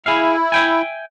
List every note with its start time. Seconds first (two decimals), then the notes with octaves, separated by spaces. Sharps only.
0.06 E4 G#4 E5 F5
0.52 E5 G5 G#5